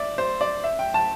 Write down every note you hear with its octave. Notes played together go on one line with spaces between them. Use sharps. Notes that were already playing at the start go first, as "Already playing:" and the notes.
Already playing: D5 E5
C5
D5
E5
G5
A5